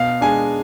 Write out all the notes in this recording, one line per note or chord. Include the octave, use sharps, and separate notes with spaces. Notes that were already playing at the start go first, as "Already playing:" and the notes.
Already playing: B2 F5
G#3 D4 G#5